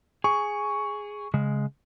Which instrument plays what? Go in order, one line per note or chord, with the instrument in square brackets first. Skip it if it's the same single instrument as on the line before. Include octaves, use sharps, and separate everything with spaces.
[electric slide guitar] G#4 [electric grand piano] C#6
[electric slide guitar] C#3 G#3